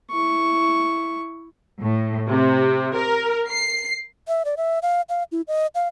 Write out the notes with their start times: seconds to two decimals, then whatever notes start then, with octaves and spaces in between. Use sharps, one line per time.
0.11 E4 C#6
1.81 A2
2.29 C3
2.96 A#4
3.50 C7
4.28 E5
4.45 D5
4.57 E5
4.82 F5
5.09 F5
5.32 E4
5.48 D#5
5.75 F5